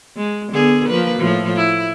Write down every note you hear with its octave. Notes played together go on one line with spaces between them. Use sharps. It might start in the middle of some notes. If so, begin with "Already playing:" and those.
G#3
D3 B3 G#4
F3 A#3 B4
A2 F3
E4